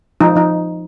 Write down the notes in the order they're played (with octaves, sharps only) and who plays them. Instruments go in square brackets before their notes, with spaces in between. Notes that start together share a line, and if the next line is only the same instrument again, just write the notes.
[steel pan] F3 D#4
F3 D#4